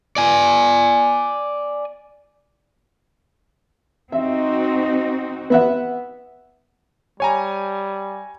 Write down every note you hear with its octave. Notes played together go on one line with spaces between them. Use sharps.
D5 G#5
C4 D#4 F#4 E5
B3 E5 F#5
G3 C#5 G#5 A#5